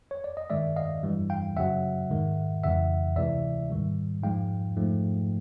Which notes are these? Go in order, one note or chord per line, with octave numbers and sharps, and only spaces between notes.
C#5
D5
D#5
G2 D#3 G#3 D5 E5
D#5 F5
G2 E3 G3
F5 G5
F#2 C#3 F#3 E5 F#5
G#2 D#3 G#3
F2 C#3 E3 G#3 E5 F#5
D2 C3 E3 G#3 D5 E5
G#2 D#3 G3
G#2 F3 G#3 F5 G5
G#2 F3 A3